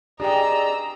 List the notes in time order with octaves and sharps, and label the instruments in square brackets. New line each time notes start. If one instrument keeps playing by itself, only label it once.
[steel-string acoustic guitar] D4 G#4 [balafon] G4 G5 [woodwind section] D5 D#5 [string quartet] A#5 E6